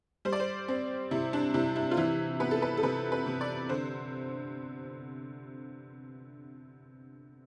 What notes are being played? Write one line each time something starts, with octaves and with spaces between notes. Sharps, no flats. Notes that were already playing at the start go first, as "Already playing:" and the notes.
G3 C5
D5
C5
C4
C3 E4
D4
C3 E4
E4
F4
E3 E4
B3 B4
A4
B4
A4
C3 B4
B4
C3
D5
D3 C5